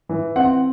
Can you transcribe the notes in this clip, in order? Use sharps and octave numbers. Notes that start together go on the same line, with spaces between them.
E3
C4 F#5